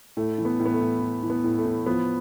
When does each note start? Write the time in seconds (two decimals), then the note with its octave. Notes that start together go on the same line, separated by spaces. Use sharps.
0.17 A2 A3
0.38 E3
0.45 B3
0.59 A2
0.65 B3
0.74 A3
0.81 A2
1.02 E3
1.23 E3
1.30 B3
1.44 A2
1.58 A3
1.65 A2
1.86 F3 B3